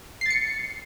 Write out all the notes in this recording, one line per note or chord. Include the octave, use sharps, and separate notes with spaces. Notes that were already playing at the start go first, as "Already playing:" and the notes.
A6 C7 C#7